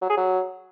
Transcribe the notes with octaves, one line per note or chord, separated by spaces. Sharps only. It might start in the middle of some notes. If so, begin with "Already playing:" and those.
F#3
G#4
F#3